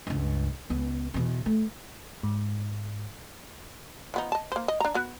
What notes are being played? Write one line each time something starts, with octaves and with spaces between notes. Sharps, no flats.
C#2 G2
C#2 B3
E2 B2
A3
G#2
F3 B3 D#4
D#5 A5
A#3 C5
D#5
D4 A#5
B3 F#4